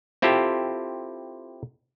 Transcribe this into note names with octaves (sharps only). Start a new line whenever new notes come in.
C4 E4 F4 G4 A4